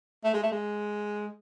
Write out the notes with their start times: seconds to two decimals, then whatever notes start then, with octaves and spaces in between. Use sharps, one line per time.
0.24 A3
0.34 G#3
0.43 A3
0.51 G#3